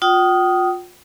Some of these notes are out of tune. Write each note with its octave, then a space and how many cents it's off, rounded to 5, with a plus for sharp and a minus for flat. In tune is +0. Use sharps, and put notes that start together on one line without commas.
F4 +30 G5 -40 D#6 +0